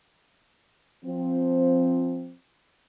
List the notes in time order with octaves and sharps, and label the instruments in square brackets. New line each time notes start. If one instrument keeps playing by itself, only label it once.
[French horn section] F3 C4